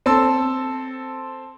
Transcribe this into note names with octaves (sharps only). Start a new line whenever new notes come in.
C4 A4 A5 C6 E6